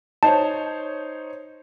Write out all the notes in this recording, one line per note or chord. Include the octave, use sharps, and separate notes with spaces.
D#4 C5 C#5 A5